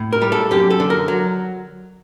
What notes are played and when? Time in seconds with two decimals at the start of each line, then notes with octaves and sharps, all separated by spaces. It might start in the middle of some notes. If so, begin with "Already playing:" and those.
Already playing: A2
0.13 A#4
0.22 G3
0.32 A4
0.51 F#2 G4
0.70 A4
0.80 D3
0.90 A#4
1.08 F#3